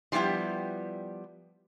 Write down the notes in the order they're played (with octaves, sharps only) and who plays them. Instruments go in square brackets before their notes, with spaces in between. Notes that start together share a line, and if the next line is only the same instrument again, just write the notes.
[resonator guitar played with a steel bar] F3 G3 B3 E4 G4